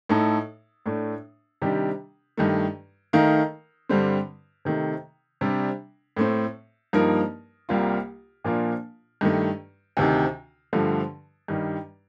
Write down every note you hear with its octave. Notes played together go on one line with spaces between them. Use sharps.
A2 A3 D#4 A4
A2 A3 D4
C3 D#3 G3 D4 G4
G2 D#3 A3
D#3 A3 D#4 A#4 F5
G2 D3 G3 C4
C3 D#3 A3
C3 G3 D4
A2 A3 C4
G2 F3 A#3 D#4 A#4
C2 C3 G3 A#3 F4
A#2 F3 A#3 D4 F4
G2 D#3 A3
D2 C3 D#3
G2 D3 F3 A3
G2 D#3 G3